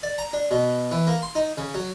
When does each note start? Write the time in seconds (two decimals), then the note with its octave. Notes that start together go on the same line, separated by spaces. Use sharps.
0.03 D5
0.18 A#5
0.33 D4
0.51 B2
0.91 E3
1.07 A#3
1.22 C6
1.35 D#4
1.58 C#3
1.75 F#3